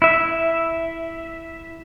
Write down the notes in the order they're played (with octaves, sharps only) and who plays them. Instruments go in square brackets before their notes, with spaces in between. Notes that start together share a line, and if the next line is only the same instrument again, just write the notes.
[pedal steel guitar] E4 E5